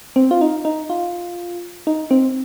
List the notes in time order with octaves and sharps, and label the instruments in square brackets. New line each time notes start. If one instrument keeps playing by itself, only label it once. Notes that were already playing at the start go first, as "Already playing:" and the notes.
[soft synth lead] C4
F4
D#4
D#4
F4
D#4
C4